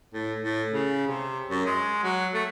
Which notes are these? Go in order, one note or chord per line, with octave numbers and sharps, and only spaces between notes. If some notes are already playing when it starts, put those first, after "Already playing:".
A2
A2
C#3
C3
F#2
G#3
F#3
A3